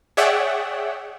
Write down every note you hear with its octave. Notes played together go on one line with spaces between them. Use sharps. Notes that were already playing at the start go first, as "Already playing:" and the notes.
G#4 C#5 D5 E5 F#5 G5